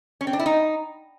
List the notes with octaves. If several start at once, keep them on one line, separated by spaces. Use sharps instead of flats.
C#4
C4
D4
E4
D#4